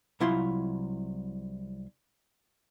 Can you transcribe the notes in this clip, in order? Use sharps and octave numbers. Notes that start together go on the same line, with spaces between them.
C2 F#3 E4 F4 C6